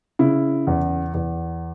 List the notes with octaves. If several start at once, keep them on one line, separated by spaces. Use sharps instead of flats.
C#3 E4
E2
E2